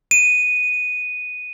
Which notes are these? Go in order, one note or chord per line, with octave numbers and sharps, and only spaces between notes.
D#7